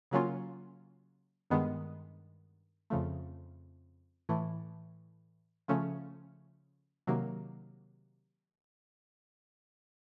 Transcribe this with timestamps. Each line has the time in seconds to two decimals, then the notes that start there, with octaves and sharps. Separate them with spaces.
0.11 C#3 F#3 A#3 C#4 F4
1.50 G2 D#3 G#3 B3 D#4
2.90 F2 C#3 F3 A3
4.29 A2 E3 A3
5.68 C#3 F3 A3 C#4
7.07 C3 D#3 F#3 A#3